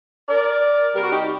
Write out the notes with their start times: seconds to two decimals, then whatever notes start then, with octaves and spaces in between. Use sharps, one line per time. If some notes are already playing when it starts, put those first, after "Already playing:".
0.28 A#4 D5
0.94 C3 G3 G4 A#4
1.04 F#4
1.10 D#4 G4